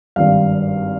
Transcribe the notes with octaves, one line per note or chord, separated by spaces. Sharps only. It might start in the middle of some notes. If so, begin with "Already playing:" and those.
G#1 G2 G3 F5